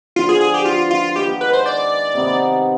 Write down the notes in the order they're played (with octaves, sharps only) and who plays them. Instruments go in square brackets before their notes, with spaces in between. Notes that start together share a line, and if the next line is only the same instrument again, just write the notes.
[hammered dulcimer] D3 F3 B3 [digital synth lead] F4
[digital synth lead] G#4
G#4
G4
F4
F4
[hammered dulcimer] D#3 G#3 B3 F4 [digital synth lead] G4
[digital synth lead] B4
C5
D5
[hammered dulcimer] C3 D#3 B3 D#4